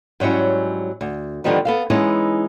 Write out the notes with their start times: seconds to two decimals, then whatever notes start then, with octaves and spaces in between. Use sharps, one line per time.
0.20 G#2 F#3 G3 C#4 E4
1.01 D2
1.44 D3 D#3 F3 G3 B3 D#4
1.65 B3 A4 F5
1.90 E3 G#3 B3 C#4 D#4 E4